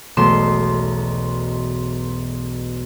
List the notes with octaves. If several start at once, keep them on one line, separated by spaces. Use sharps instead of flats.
E1 B1 A3 C6 E7